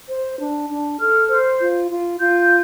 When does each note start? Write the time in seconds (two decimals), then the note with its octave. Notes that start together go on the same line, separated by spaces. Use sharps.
0.09 C5
0.39 D4
0.69 D4
0.99 A4 F6
1.29 C5
1.60 F4
1.90 F4
2.20 F4 G6